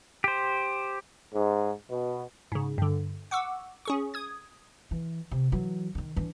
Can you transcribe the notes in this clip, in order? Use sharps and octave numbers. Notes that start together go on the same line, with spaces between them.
G4 C5
G#2
B2
G#2 C#3
G2 D3
F#5 C#6 D6 E6
C#4 G#4 C#6
D#6 G#6
E3
C3
E3 F#3
D3 D#3
E3 D4